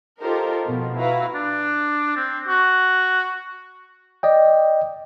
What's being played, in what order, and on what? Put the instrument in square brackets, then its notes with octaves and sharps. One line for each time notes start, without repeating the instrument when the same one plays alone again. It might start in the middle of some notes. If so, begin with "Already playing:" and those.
[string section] D#4 F4 G4 A4 A#4 C5
B2 F3
E4 F#4 B4 F5 A#5
[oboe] D4
C4
F#4
[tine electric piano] D5 D#5 G5